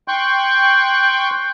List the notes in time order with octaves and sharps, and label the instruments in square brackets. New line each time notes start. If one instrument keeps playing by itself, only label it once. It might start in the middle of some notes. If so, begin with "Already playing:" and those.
[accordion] G5 C6 C#6 F#6 G6